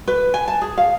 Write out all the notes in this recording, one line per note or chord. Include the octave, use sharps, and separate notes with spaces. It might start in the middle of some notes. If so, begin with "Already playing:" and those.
B4
G#5
A5
G#4
F5